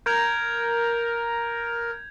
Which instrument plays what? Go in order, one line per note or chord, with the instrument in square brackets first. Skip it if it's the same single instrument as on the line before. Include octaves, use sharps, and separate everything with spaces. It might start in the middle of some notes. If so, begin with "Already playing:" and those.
[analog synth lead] A#4 [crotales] G6 G#6 F7